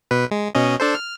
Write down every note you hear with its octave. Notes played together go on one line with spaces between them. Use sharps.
B2 B4
G#3
B2 C#4 D#5
D4 A4 C5
F6